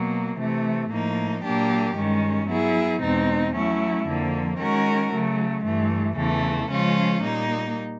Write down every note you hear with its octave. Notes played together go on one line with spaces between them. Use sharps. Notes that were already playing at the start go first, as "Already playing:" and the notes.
Already playing: B2 F#3 A#3
C3 E3 A3
A2 F3 A#3 D#4
A#2 F#3 A#3 D4 G4
G2 D#3 G#3 C#4
F#3 B3 E4 G#4
E2 B2 G#3 C4 D#4
F#3 A3 C#4 E4
F2 D3 F3 A#3
D#3 G#3 C#4 F#4 A#4
C#3 F#3 A3
G2 E3 A3
E2 C#3 E3 A3
C#3 F3 G#3 C#4 F4
A#2 G3 A#3 D#4